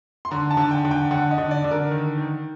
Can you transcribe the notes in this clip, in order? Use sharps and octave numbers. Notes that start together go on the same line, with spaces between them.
C6
D3 A#5
A5
D3
G5
D3
G5
D3 F#5
D#5
D3
D5
D3
A#4
D#3
D#3